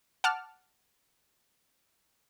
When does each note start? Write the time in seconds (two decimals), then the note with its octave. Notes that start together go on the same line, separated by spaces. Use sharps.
0.24 F#5 A5 D6 F6